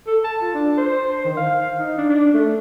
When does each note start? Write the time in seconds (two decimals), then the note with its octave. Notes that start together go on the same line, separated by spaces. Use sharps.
0.07 A4
0.24 A5
0.41 F4
0.54 D4
0.78 C5
1.25 D#3
1.37 F5
1.61 F5
1.79 D#4
1.98 D4
2.09 D4
2.34 A3